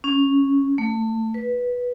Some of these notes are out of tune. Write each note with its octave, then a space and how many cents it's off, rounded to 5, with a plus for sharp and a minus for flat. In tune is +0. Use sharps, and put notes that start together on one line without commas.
C#4 -5
A3 +25
B4 -10